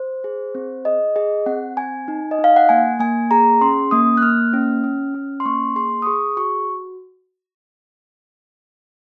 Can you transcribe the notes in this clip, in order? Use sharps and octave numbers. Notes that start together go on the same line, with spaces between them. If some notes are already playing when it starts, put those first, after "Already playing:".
Already playing: C5
G#4
C4
G#4 D#5
G#4 D#5
C4 F#5
C4 G#5
D#4
D#5
D#4
F5
F#5
A#3 G#5
A#3 G#5
G#4 A#5
C#4 C6
A#3 D#6
F#6
A#3 F6
C#4
C#4
C#4
C6
A#3 C#6
G#4 C6
D#6
G#4 C#6
F#4 C#6